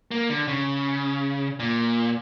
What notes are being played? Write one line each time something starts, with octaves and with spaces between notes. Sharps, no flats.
A#3
D3
C#3
A#2